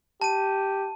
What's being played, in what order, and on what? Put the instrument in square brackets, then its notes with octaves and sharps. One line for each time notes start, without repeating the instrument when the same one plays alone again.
[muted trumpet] G4 [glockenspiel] A5 D#7